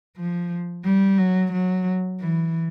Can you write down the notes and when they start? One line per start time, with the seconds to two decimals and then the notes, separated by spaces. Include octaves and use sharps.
0.17 F3
0.84 G3
1.18 F#3
1.52 F#3
2.20 E3